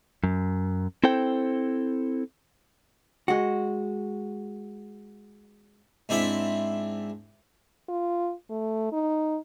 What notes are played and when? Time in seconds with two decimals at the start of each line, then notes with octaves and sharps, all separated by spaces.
0.24 F#2
1.04 C4 E4 A4 C5 G5
3.28 G#3 F#4
6.09 G#2 C4 D4 E4 E5 B5
7.89 F4
8.50 A3
8.92 D#4